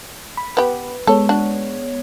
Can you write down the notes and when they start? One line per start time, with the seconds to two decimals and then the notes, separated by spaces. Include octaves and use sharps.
0.37 B5
0.57 B3 G4 B4
1.07 G#3 B3 A4 C#5
1.29 D4 F#4